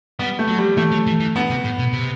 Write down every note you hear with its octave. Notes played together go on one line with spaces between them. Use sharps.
G3 B3
A3
F#3
G3
E3 A3
F#3
E3
E3
D3 B3
C3
A2
B2
C3